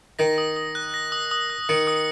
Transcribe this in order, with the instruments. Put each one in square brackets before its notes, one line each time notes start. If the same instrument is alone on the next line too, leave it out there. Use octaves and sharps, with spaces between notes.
[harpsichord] D#3 [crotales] A#6
[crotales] D#6
D#6
F#6
A#6
D#6
D#6
F#6
[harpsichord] D#3 [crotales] C#7
[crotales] D#6